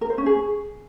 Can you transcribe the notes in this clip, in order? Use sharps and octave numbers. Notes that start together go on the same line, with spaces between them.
A#4
C5
C#4
G#4